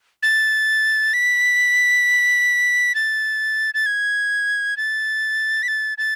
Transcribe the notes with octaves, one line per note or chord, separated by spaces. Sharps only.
A6
B6
A6
A6
G#6
A6
B6
A6
A6